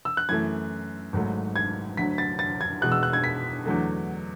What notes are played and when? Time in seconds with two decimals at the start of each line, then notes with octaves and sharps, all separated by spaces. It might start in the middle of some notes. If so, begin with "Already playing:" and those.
0.05 E6
0.17 F#6
0.29 F#2 E3 A3 G#6
1.13 G#1 G#2 F#3 A3
1.56 G#6
1.97 D2 D3 F#3 B6
2.18 A6
2.39 A6
2.61 G#6
2.81 E2 B2 G#3 F#6
2.92 E6
3.03 F#6
3.13 G#6
3.24 B6
3.66 E2 D3 F#3 A3